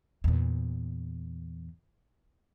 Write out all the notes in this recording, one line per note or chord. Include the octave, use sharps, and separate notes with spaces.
E2 A#2